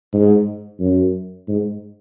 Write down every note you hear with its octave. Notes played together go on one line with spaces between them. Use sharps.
G#2
F#2
G#2